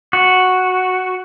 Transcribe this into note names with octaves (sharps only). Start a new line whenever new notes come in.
F#4